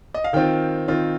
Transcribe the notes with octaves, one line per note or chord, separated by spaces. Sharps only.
D#5
F5
D#3 C4 F4 G5
D#3 C4 F4